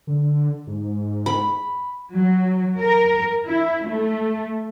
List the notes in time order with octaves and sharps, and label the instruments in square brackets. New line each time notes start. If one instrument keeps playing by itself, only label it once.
[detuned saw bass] D3
G#2
[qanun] B5
[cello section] F#3
A#4
E4
A3